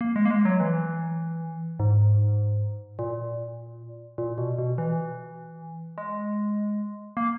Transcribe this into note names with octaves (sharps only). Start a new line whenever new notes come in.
A#3
G#3
A#3
G#3
F#3
E3
G#2
A#2
A#2
B2
B2
E3
G#3
A#3